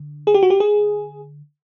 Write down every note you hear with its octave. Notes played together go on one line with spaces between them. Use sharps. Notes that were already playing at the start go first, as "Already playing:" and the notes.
Already playing: D3
G#4
G4
F#4
G4
G#4